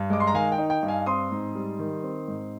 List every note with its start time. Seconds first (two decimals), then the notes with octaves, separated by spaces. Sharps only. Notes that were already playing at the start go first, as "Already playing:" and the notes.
Already playing: G2
0.10 G#3 D6
0.20 C6
0.27 A#5
0.34 D#3 F5 G#5
0.52 G5
0.58 D#4
0.70 G5
0.83 G2
0.88 F5 G#5
1.06 C4 C6 D#6
1.31 G#2
1.55 G3
1.79 D#3
2.04 C4
2.28 G#2